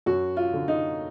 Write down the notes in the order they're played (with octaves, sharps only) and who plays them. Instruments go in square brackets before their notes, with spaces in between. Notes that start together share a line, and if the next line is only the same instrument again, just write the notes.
[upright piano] F#2 F#4
F4
D3
D#4